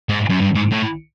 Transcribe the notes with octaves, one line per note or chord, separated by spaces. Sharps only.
G#2
F#2
G2
G#2
A2